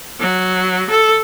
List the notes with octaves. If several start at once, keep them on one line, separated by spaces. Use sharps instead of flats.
F#3
A4